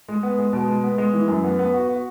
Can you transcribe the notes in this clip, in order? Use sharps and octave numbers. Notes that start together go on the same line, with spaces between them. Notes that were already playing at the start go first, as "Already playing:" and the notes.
G#3
B3
G#3
B2
G#3
B3
G#3
E3
F#2
B3
B3
F#4
F#4